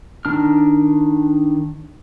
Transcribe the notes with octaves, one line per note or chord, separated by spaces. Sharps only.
D#3 D4 F6